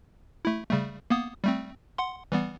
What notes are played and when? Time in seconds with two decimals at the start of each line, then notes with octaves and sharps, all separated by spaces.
0.45 A3 E4
0.71 C#3 G3 A3
1.10 A#3 B3 D#6
1.44 G3 A3 C4
1.98 F#5 C6
2.32 E3 G3 B3